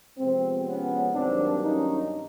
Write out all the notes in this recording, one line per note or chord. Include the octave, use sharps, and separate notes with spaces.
C3 F3 G#3 B3 C4
B3 C#4
G2 D#3 F#3 A#3 C4 D4
C#4 D#4